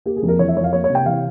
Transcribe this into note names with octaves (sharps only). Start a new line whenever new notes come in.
A#3 G4
G#4
F2
A#4
E3 C#5
E5
F2 C#5
F5
A#3 C#5
C#5
C3
G5
E3 F5